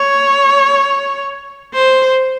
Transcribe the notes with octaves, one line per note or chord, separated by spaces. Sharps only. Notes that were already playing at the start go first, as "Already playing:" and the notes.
Already playing: C#5
C5